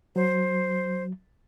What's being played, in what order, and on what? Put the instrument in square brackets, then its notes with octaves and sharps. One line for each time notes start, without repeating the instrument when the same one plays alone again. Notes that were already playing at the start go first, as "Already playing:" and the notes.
[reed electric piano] F#3 [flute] C5